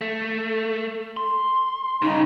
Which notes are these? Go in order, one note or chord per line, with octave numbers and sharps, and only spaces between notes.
A3
C6
G2 C#3 D#4